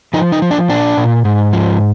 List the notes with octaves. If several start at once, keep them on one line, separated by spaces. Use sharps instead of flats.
F3 D#4
D#4
F3
D4
A#2 D4
A#2
G#2
F3